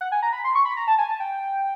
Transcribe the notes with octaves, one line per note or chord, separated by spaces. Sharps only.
F#5
G#5
A#5
B5
C6
C#6
B5
A#5
A5
G#5
A5
G5